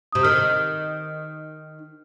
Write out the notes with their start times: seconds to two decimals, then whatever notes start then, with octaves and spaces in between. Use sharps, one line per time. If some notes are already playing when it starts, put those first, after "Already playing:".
0.12 C3 D#6
0.23 D#3 F6